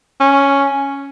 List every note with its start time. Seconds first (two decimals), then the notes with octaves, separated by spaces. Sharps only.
0.20 C#4